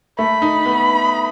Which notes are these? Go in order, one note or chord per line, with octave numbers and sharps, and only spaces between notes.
A3 B5
D#4
B3